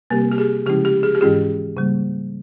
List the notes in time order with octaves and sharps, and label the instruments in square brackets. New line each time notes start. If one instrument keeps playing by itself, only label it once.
[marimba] C3 G3 C4 G4 A#4 [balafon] A#3
[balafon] G4
G#4
[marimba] C#3 F3 G#3 C#4 E4 [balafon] G4
[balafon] G4
G#4
G4
[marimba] G#2 E3 G#3 C#4 F4 [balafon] G#4
[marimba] C#3 G3 A#3